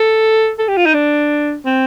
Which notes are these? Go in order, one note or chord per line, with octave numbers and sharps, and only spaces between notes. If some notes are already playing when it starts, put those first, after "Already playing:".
Already playing: A4
A4
G4
F4
D#4
D4
C4